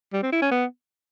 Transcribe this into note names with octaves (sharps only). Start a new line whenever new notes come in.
G3
C4
E4
C#4
B3